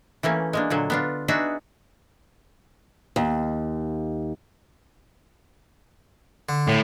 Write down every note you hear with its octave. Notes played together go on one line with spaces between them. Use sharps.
E3 A3 A#3 C#4
G#3 A#3 D4
A#2 D3 F#3
B3 D4 F4
B3 D4 D#4 F#4 G#4 E5
D#2
D3
A2